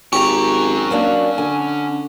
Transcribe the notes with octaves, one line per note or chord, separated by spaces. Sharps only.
G#1 C#4 G4 A#5 C#6
F#3 A#3 D4
D3 G#5